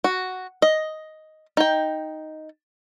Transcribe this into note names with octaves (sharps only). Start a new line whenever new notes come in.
F#4
D#5
D#4 G5